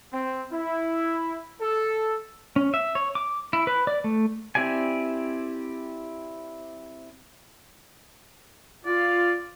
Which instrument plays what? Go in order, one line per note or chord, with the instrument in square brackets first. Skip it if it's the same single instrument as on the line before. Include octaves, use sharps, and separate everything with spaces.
[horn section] C4
E4
A4
[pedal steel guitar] C#4
E5
C#5
D6
E4
B4
D5
A3
C4 E4 G4 D5 G#5
[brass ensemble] F4 [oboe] D5